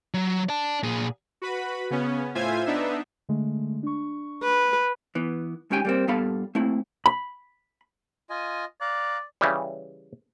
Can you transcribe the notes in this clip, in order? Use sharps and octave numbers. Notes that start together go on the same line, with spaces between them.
F#3
D5 A5
A#2 G#4
F#4 B4 B5
C#3 B3 C#4
A2 F4 C5 E5 G#5 G#6
B3 D4 D#4 E5
D3 G#3 A3
D4 C#6
B4
E3 B3
G#2 C#4 G4 G5 G#5
G3 A#3 C4
G2 A#2 B3 A4 F5 B5
A3 A#3 C4 E4
B5
F4 D#5 G#5
D5 F5 A#5 F#6
C#3 E3 G3